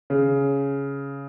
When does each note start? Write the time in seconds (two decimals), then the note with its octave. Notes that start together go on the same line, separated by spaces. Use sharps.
0.10 C#3